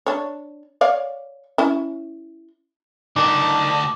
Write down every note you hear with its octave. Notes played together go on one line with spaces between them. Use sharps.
D4 C#5
C#5 D5 F5
C#4 E4
D2 D4 D#4 A#4 A5 D6